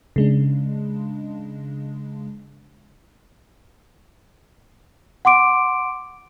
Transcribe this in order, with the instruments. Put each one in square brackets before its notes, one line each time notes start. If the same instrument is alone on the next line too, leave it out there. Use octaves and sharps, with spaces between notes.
[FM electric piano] C#3 G#3 D4
[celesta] F#5 C6 D6 D7